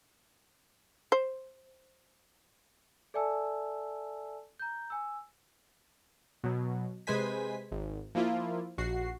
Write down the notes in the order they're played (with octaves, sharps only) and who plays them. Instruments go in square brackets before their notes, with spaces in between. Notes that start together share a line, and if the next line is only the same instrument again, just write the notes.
[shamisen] C5
[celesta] A4 D5 E5 G#5 A5 E6
A#5 G6
G#5 E6
[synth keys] B2 F#3
C3 G#3 B4 C5 G#5 B6
G#1
F3 A#3 E4 F4
A#1 F#4 C7